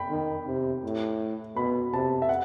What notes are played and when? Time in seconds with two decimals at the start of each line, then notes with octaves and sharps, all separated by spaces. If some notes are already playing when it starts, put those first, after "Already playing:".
Already playing: G5 B5
0.10 D#3
0.47 C3
0.84 A2
1.56 B2 B5
1.93 C3 A5
2.22 E5
2.29 F#5